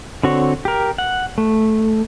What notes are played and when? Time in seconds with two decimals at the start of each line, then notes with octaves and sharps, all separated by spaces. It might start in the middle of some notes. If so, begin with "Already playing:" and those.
0.23 D3 C4 F#4 C#5
0.65 G4 A#4
0.98 F#5
1.38 A3